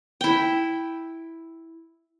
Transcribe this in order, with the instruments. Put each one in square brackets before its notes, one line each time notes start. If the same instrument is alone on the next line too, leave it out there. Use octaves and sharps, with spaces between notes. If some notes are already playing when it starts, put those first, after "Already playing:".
[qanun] E4 G5